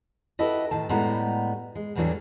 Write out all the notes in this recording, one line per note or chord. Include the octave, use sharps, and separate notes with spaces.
E4 F#4 G4 A4 B4 D#5
A2 D#3 A5
A2 G3 G#3 B3 F#4 A#5
G#3
E2 A2 E3 F#3 G3 D4